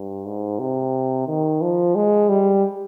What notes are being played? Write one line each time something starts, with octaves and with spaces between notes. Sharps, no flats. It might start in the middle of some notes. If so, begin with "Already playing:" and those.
Already playing: G2
G#2
C3
D#3
F3
G#3
G3